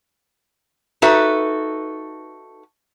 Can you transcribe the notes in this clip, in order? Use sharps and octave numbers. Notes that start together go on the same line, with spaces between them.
D#4 F#4 A4 B4 E5